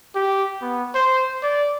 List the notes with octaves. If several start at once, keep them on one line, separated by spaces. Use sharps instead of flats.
G4
B3
C5
D5